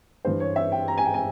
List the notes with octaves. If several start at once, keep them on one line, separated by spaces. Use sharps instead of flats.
G2 E3 C5
C#5
E5
G5
A#5
G#5
G5
G#5